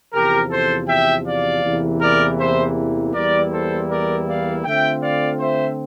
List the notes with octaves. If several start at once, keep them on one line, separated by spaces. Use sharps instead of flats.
E2 C3 F3 G4 A#4
A4 C5
E5 G5
D5 F5
E2 C3 E3 A#3
A#4 D5
C5 E5
E2 E3 G3 A#3 E4 A#4 D5
A4 C5
A#4 D5
D5 F5
D3 A3 C4 F4 E5 G5
D5 F5
C5 E5